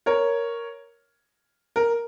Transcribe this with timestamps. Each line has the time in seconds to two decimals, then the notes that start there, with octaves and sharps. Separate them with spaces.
0.06 A#4 C#5
1.76 A#4